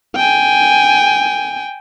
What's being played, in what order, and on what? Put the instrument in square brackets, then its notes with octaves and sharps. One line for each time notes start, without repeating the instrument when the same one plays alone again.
[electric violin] G5 G#5